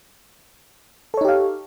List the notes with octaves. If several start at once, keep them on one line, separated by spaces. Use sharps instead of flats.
D#4 G4 A4 C#5 F5